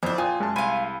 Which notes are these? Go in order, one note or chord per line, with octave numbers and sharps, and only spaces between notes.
F2 F#3 D4 E4 C5
A#2 F4 G5 G#5 D#6
F#2 G#3 A5
C2 F5 G#5 B5 C6 D#7